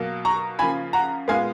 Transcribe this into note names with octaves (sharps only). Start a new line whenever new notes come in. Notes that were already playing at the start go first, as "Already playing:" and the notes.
Already playing: B2 F#3 A#3
A#5 C#6
C#3 F3 A#3 G#5 B5
F#5 A#5
A#2 G#3 B3 F5 G#5